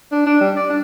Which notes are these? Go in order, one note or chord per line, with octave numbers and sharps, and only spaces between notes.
D4
D4
G3
D5
D4